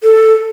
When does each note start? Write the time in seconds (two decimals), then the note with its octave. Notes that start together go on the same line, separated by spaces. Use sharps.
0.04 A4